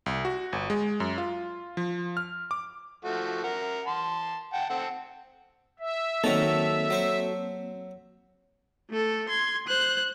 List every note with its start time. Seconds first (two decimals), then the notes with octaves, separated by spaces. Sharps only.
0.06 C2
0.25 F#4
0.53 G1
0.70 G#3
1.00 F#2
1.18 F4
1.77 F3
2.17 F6
2.51 D6
3.05 F3 A3 F#4
3.44 A#4 F#5
3.87 A5 C6
4.53 F#5 G5 A5
4.69 C4 A4 F#5
5.79 E5
6.24 D#3 F#3 A#3 C4 D#4 F#4 A4
6.90 F#3 C5 C#6
8.90 A3 A4
9.29 C6 G#6
9.68 C5 F#6